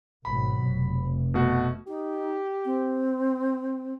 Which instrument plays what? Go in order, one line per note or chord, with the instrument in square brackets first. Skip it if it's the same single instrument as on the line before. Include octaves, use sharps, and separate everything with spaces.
[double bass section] G#1 B2 F#3 [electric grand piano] B5
[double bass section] F1
[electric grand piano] B2 A3 F#4
[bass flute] D#4 [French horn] G4
[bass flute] C4